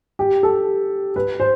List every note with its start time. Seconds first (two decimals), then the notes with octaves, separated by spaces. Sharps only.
0.19 G4
0.43 A4
1.16 B4
1.40 C5